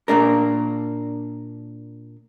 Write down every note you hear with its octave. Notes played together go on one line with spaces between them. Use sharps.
A#2 A#3 D4 A#4